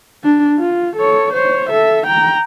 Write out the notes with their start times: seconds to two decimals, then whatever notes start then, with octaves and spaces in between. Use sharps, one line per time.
0.24 D4
0.59 F4
0.96 A4 C#5
1.33 C5 C#5
1.70 A4 E5
2.07 G5 A#5